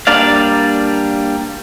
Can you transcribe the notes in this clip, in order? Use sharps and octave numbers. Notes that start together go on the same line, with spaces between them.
G3 A#3 D4 D5 F5